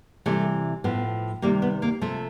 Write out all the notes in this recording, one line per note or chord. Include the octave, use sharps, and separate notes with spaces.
C3 E3 G3 A3
A2 F3 B3
C3 D#3 G3 A#3
B3
A#3
C3 F3 A3